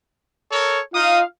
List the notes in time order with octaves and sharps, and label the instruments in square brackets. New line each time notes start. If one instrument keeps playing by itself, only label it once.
[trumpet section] A4 A#4 C#5
[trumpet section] D#4 D#6 [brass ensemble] F4 F5